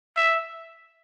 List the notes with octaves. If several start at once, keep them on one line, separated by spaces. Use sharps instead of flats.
E5